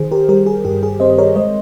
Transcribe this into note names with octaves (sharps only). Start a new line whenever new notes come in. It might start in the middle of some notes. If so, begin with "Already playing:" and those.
Already playing: D#3 G#4 C5
G4 A#4
G3 G4 A#4
G#4
G2 G4
G#4
C4 C5 D#5
C5
A#4 C#5
G#3 C5 D#5